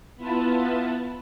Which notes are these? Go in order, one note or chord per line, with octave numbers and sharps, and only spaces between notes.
B3 E4 F4 B4 A5